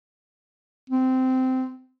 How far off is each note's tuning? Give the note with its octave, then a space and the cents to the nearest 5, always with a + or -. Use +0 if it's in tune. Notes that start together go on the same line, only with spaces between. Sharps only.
C4 -15